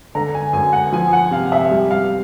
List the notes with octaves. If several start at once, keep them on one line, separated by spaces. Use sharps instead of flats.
D3 A#5
G#5
F#2 G#5
F#5
F3 G#5
F#5
C3 F5
E5
G3
F5